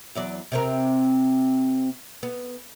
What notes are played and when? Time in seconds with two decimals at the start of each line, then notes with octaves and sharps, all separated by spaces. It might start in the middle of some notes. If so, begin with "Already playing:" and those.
0.15 E2 F#3 D5
0.52 C3 C4 A#4
2.23 B3